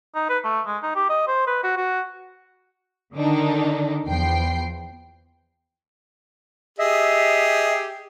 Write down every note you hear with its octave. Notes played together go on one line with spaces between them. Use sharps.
D#4
B4
A3
G#3
D#4
G4
D#5
C5
B4
F#4
F#4
D3 D#3 D4 D#4
E2 F3 G5 C7
G4 G#4 D#5 E5